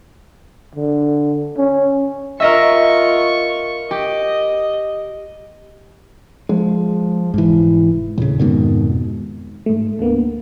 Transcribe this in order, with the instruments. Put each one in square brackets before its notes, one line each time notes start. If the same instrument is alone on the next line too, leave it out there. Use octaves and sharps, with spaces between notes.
[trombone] D3
C#4
[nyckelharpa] F4 C#6 [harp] A#4 D#5 E5
[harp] G4 [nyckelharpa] D#5
[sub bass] F3 [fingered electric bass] G#3
[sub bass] F1 [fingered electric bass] G#2 E3
[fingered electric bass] D#1 C#3 [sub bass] A2
[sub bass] F2 [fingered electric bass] G#2 B2 D#3
[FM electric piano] G#2 A3
D2 D3 A#3 B3